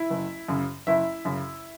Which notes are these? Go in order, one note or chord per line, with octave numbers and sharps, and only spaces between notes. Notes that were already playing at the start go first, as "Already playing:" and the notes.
Already playing: E4 E5
F#1
F#2 C#3
F#1 E4 E5
F#2 C#3